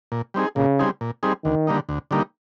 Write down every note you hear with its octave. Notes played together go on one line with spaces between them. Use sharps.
A#2
G3 C4 D#4 G#4
A#2 C#3
G3 C4 D#4 G#4
A#2
G3 C4 D#4 G#4
D2 D#3
D3 G3 A#3 D#4
D2
D3 G3 A#3 D#4